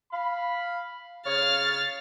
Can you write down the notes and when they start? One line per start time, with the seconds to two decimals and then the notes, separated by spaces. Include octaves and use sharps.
0.12 F5 B5
1.27 C#3 C#5 F5 F6 A6